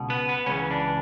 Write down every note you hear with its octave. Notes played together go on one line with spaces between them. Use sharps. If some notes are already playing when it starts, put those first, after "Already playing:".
Already playing: C#2 B2
B3
B3
C#2 C#3 E3 C#4
D4